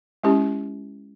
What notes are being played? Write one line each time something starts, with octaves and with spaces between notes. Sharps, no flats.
G#3 C#4 E4 G4